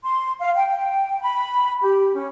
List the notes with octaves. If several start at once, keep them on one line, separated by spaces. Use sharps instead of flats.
C6
F5
G5
B5
G4
C#4